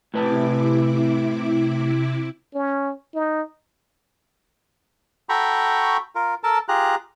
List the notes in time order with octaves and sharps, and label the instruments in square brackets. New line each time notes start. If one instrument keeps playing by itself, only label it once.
[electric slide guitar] A2 B4 A5 [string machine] C3 E4 D6
[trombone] C#4
D#4
[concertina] F#4 A4 G5 A#5 B5 C#6
F4 A#4
A4 A#4 A5
F4 G4 G#4 A#5 F#6